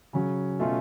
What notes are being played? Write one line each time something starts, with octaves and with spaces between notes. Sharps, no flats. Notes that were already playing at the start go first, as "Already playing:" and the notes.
C#3 F#3 C#4
B2 A3 C#4 F4